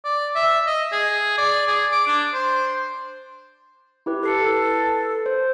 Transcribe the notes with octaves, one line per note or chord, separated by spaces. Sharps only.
D5
E5
D#5
G#4
D5
G#4
D6
D4
C5
E4 G4 B4
A4 B4 C7 C#7
C5